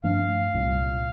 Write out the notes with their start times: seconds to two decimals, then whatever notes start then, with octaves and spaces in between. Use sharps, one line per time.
0.03 G2 F3 A3 D4 F5
0.54 C2 A#2 G3